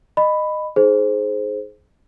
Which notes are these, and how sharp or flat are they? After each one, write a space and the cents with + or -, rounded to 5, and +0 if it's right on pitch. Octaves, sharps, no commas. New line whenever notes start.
D#5 -20 B5 +10
D#4 +5 G#4 +20 C5 +0